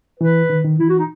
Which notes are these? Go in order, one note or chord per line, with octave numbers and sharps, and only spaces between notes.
E3 B4
D#3
D#3
E3 E4
F#4
D#4